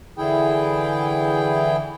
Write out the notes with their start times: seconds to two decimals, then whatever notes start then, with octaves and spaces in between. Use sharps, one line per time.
0.18 D3 E3 E4 G#4 G5